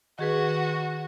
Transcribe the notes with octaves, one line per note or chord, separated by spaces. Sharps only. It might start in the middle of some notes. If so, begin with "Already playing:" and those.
D#3 F#4 G#4 B4